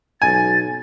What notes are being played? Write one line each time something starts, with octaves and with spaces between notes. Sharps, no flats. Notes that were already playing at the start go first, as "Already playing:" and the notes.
B1 G#5 A6